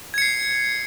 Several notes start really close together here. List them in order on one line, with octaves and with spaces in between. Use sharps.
G#6 C#7 C7